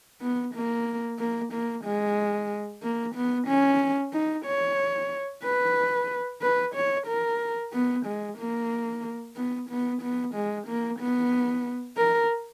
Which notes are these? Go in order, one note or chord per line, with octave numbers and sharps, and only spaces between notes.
B3
A#3
A#3
A#3
G#3
A#3
B3
C#4
D#4
C#5
B4
B4
C#5
A#4
B3
G#3
A#3
B3
B3
B3
G#3
A#3
B3
A#4